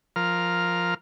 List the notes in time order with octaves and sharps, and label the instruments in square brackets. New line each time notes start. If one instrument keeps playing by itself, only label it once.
[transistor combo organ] F3 A#4 F6